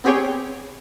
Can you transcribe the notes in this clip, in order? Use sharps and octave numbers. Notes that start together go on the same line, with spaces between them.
B3 C4 G4 G#4 C#5 G5